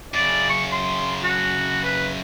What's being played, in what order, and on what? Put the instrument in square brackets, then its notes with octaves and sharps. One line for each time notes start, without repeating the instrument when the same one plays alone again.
[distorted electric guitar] F#2 C#3 [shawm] D5
[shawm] C#6
C6
F#4
B4